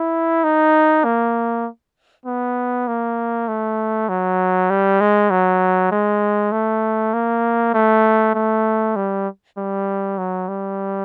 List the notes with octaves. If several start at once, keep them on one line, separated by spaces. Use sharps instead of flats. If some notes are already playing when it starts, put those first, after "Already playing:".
Already playing: E4
D#4
A#3
B3
A#3
A3
F#3
G3
G#3
F#3
G#3
A3
A#3
A3
A3
G3
G3
F#3
G3